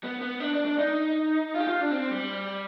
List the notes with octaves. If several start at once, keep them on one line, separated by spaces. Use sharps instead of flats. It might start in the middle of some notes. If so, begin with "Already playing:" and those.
B3
B3
D4
D4
D4
D#4
F4
G4
F4
D4
C4
G3